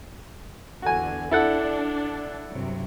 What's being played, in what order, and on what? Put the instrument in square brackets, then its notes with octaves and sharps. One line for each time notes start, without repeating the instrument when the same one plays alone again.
[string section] E2 D3 [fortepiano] F#4 G#5
[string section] D4 [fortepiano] E4 A4 F#5
[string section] G2 C3 F#3